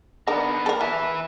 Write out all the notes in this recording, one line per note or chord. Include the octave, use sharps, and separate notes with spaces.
D3 B3 D#4 A#4
A4 A#4
E3 B4 E5